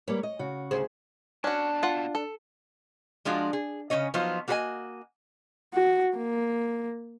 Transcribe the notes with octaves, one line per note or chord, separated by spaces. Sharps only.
G3 A#3 B4 C#5
D#5
C#3 F#4
D2 G#4 C5
B2 C#4 D4 F#4 A5
F4 F#5
A4
F3 G#3 D4 F4 F#4
G#4
C#3 A3 C#4 C#5 D#5
F3 F#3 B3 D#4 F4 C5
A#3 F#4 G#4 B4 D#5 G#5
F#4
A#3